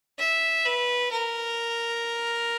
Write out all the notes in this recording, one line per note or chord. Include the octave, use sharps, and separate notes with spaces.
E5
B4
A#4